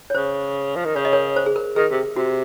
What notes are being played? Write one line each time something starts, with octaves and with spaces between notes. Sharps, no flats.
C#5
C#3 C5
F3
D#3
C#3 C#5
D#5
A#4 C#5
C5
G#4
A#4
D#3 G#4
C3
C3 F#4